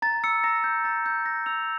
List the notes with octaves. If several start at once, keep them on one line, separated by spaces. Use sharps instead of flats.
A#5 A6
E6 C#7
A#5 A#6
G6
A#5 A6
E6 G6
A#5 A#6
E6 F7